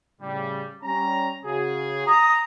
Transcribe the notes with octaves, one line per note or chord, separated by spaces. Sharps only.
A2 C#3 G3
G3 C#4 A#5
C#3 F#4 G#4
A#5 D#6